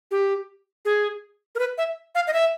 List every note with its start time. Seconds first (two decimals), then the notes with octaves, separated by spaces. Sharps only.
0.11 G4
0.85 G#4
1.55 A#4
1.59 B4
1.78 E5
2.15 F5
2.27 D#5
2.33 E5